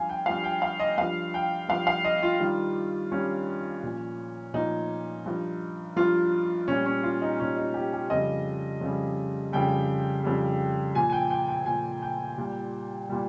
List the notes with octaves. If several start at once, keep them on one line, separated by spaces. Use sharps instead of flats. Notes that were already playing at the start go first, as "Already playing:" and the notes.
Already playing: G2 F3 F5 G#5
G5
G2 F3 F5
G5
F5
D#5
G2 F3 F5
G5
G2 F3 F5
F5
D#5
F4
G2 D#3 G3
G2 D#3 G3 C#4
A#2 F3
A#2 F3 D#4
G2 F3
G2 F3 F4
A#2 G3 C#4
C#4
F4
D#4
A#2 G3 C#4
D#4
G4
G4
F2 C#3 G3 D#5
F2 C#3 G3
F2 C#3 G3 G5
F2 C#3 G3
A#2 F3 G#5
G#5
G5
G5
G5
A#2 F3 G#5
G5
A#2 G3
A#2 G3